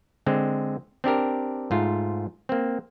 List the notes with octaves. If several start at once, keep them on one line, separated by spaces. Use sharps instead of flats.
D3 G#3 C4
C4 D4 G4 A#4
G#2 A3 F4
A#3 C4